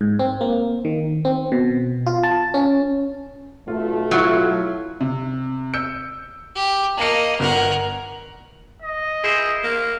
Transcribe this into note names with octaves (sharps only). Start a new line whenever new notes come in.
G#2
C4
A#3
D#3
C4
B2
F4
A5
C#4
B1 A3 F4
F#3 E4 F4
C3
E6 G6 C#7
G4
A#3 D#5 A5 C#7
G1 A#4 F#5
D#5
E4 G#4 C5
A#3